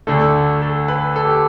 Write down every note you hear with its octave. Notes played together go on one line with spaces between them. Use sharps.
D2 D3 A3 A4
A4
B4
A4
G4